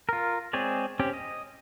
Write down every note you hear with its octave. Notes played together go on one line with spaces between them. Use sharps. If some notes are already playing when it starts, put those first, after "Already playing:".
F4 A#4
G#3 C4 G#4 C#5 D5
C4 C#4 G4
D#5